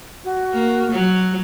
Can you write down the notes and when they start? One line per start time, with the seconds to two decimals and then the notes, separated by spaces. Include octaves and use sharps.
0.24 F#4
0.53 A#3
0.91 F#3